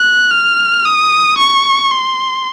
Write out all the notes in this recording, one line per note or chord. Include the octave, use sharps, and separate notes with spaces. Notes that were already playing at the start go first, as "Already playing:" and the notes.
Already playing: F#6
F6
D#6
C#6
C6